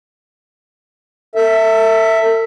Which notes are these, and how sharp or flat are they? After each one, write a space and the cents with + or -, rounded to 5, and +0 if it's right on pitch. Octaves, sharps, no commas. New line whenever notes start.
A4 +45 E5 +0